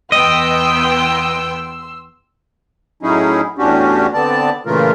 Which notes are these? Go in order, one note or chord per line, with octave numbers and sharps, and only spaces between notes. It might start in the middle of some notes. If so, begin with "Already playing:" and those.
E2 B3 D#5 G5 C6 E6
A2 F#3 C#4 D#4 E4 G#4
E2 A2 C#4 D4 F#4 G4
D3 B3 C4 D5 A5
A#2 C#3 E3 A3 F4 A#4